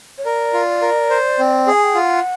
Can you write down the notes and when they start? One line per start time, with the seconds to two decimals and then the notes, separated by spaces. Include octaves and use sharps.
0.18 C#5
0.25 A#4 D5
0.53 F4
0.82 A#4
1.10 C5
1.39 C4
1.67 G#4
1.72 G#5
1.84 G5
1.95 F4 F#5